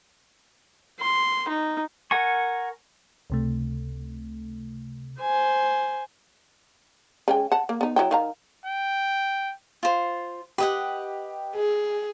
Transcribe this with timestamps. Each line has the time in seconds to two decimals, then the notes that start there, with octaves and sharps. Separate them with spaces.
1.00 C6
1.49 D#4
2.11 A#4 F#5 G#5 C#6
3.30 C#2 C3 A3
5.21 C5 G#5
7.28 C#3 G#3 G5
7.52 F#5 A5
7.69 A#3
7.81 B3 D#4
7.96 F#3 E4 G5
8.11 D#3 F5 A#5
8.66 G5
9.83 F4 C5
10.58 G4 B4 D#5 F#5
11.56 G#4